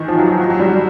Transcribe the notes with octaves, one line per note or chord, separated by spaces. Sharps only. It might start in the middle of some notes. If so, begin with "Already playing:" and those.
Already playing: D#3 E3
F3
F#3
F3
F#3
F#3
G3